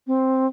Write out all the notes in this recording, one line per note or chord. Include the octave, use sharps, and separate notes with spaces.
C4